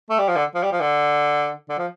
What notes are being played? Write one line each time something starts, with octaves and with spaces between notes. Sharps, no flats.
A3
G3
F3
D3
F3
G3
F3
D3
D3
F3